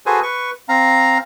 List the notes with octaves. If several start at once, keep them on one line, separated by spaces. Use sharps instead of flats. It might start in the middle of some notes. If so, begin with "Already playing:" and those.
F#4 G#4 A4 B4 C5 G#5
B4 C#6
C4 F5 A#5